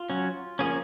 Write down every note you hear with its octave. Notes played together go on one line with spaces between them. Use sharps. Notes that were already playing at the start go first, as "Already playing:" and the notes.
Already playing: F4
F#3 C#4
F3 A#3 C#4 G#4